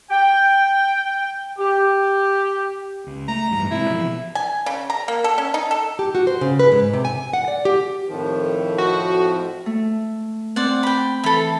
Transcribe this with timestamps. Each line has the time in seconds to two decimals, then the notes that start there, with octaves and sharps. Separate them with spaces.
0.11 G5
1.59 G4
3.06 C#2
3.28 A3 A#5
3.51 A1 G2 G3
3.71 G#1 G#2 C3 E4
3.90 B2 E3 F3
4.35 G#5
4.66 C#3
4.90 A#5
5.08 A#3
5.24 A4
5.38 C#4
5.54 D#4
5.71 A4
5.99 G4
6.15 F#4
6.27 C5
6.41 C#3
6.59 B4
6.72 G#2
6.93 C3
7.05 G#5
7.33 F#5
7.48 D5
7.65 G4
8.08 F2 A2 D#3 F3
8.78 F#4
9.66 A3
10.56 C4 D5 F#5
10.83 G5 B5
11.24 E3 A4 B5